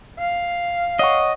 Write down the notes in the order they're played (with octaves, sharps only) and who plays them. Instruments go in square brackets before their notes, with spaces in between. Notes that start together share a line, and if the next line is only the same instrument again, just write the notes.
[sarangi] F5
[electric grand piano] C#5 F#5 C#6 [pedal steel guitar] D#5